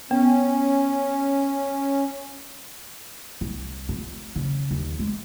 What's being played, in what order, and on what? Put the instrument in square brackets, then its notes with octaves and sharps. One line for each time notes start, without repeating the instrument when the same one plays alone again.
[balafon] B3 [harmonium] C#4
[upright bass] C2
F1
C#3
D#2
G#3